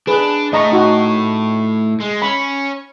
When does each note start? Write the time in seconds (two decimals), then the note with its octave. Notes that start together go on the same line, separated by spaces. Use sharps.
0.07 D4 G#4 B4
0.53 A2 A3 D#5 A#5 C#6
0.72 D#4 F#4
2.00 G#3
2.22 C#4 B5